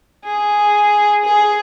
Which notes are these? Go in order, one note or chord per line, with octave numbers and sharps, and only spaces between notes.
G#4
G#4